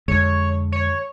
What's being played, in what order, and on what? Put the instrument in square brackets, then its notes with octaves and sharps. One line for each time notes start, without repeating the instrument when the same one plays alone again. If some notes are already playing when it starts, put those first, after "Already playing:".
[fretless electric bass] F2 D3 G#3 [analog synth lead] C#5
[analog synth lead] C#5